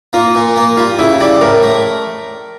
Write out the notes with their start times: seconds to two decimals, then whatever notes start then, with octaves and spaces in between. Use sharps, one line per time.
0.13 A#3 F4
0.35 A#2
0.56 A#3
0.77 G3 F4
0.99 C#3 E4
1.20 G3 D5
1.41 A2 A#4
1.63 A3